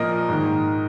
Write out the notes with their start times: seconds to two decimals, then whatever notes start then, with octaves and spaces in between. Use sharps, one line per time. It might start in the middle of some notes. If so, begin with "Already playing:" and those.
Already playing: A#2 F3 A#4 D#5
0.29 G#2 D#3